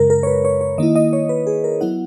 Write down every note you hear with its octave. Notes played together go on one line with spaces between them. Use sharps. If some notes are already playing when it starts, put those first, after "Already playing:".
Already playing: F#2 C#3 G#3 A#4
A#4
C#5
B4
C#5
C#5
D#3 A#3 E4 D#5
D#5
C#5
B4
G#4
A#4
F#3 B3 E4 F#5